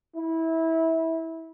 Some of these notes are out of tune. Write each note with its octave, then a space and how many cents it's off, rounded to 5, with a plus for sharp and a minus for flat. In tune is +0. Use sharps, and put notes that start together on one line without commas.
E4 -20